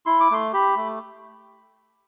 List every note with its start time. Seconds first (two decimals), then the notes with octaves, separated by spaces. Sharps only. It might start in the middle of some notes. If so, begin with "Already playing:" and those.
0.06 E4 C6
0.20 D6
0.31 A3 C6
0.53 G4 B5
0.77 A3